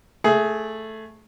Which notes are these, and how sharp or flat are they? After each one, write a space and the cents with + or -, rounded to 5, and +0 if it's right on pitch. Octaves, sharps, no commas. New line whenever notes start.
A3 +0 G#4 +15